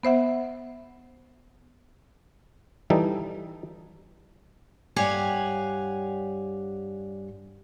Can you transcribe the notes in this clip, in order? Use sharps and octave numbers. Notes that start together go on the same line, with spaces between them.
B3 C5 E5 F#5
E3 G3 D#4 A4
G2 G4 C#5 F5 F#5 G#5